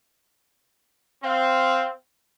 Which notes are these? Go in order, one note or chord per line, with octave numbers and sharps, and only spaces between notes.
C4 F5